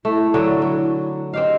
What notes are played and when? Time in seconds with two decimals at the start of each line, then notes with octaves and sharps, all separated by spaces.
0.05 A3 E4
0.34 D3 F#3
0.62 F#3
1.34 C4 G4 D#5 F5